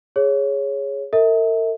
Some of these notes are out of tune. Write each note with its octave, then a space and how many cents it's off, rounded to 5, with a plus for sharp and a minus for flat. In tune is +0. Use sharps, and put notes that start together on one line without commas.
G#4 -5 C#5 +0
A#4 -45 E5 -40